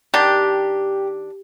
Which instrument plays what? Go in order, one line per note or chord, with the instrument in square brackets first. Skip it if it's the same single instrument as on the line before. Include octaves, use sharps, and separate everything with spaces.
[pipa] D#3 D4 [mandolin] G4